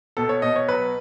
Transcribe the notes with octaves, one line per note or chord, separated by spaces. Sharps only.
B2 A4
C#5
B2 D#5
C#5
F#3 B4